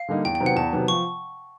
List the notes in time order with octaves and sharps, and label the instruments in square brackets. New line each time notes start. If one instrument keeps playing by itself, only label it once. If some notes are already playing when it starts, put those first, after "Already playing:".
Already playing: [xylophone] F5
[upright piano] D3 G3 A#3 D#4
[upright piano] E2 [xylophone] G5
[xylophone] G5
[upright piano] C3 D#3 F#3 B3
[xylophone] F#5
[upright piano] E2 [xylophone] A5
[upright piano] C3 D#3 F#3 B3
[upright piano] F3 [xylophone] C#6